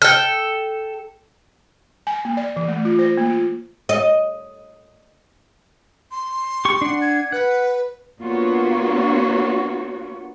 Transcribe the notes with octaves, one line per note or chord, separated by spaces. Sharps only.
A4 G5 F6
G#5
A#3
D5
E3
A3
F4
C5
A#3
F4
D#5
C6
G4 C#6
D4 F#5
G#6
B4 F#5
A#3 B3 D4 F4 F#4 C#5